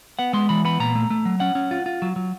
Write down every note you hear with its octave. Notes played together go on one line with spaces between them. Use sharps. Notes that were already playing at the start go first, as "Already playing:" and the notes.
B3 F#5
G#3 C6
E3 B5
B3 B5
A#2 A#5
A3
A3
F#3
C#4 F#5
C#4
F4
F4
F#3
F#3